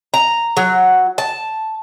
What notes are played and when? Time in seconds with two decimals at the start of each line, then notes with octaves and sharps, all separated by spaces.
0.14 A#5
0.57 F#3
1.18 A5